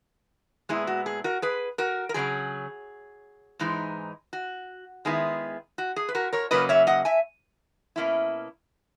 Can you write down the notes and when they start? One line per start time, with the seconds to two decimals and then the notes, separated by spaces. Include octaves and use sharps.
0.69 A#2 G#3 B3 E4 G#4
0.87 F#4
1.06 G#4
1.24 F#4 A#4
1.42 G#4 B4
1.78 F#4 A#4
2.09 A#4
2.14 C#3 F#3 C#4 G#4
3.59 G#2 E3 G#3 D#4
4.33 F#4
5.05 D#3 G#3 B3 E4 G#4
5.78 F#4
5.96 G#4
6.09 B4
6.15 F#4 A#4
6.33 A#4 C#5
6.51 C#3 F#3 A#3 C#4 B4 D#5
6.69 C#5 E5
6.87 D#5 F#5
7.05 E5 G#5
7.96 B2 A#3 C#4 E4